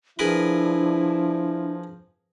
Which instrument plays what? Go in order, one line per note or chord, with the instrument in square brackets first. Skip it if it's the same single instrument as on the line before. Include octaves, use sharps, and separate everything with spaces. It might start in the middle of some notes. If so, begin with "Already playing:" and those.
[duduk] F3 [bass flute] D4 [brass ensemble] E4 [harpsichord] G#4 A#4 B4